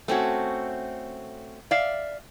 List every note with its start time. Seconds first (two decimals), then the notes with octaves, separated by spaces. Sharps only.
0.08 A3 C4 C#4 F#4
1.71 D5 E5 F5